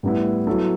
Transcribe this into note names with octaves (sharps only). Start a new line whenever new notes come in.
A2 G3 B3 E4
F#3 B3 E4 A4